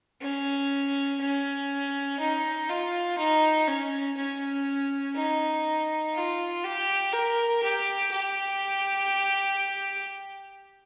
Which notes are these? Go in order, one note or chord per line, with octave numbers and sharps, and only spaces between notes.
C#4
C#4
D#4
F4
D#4
C#4
C#4
D#4
F4
G4
A#4
G4
G4